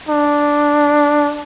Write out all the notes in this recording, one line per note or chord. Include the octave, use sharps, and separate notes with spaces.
D4